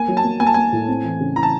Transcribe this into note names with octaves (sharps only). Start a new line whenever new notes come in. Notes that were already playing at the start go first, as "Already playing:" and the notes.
Already playing: A#3 G#5
F#3
A5
A#3
A#3 G#5
A5
A#3 G#5
A2
C4
E3
C#3
E3 A#5
A5